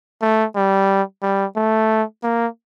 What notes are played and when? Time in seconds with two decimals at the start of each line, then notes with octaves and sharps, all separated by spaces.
0.22 A3
0.55 G3
1.22 G3
1.56 A3
2.23 A#3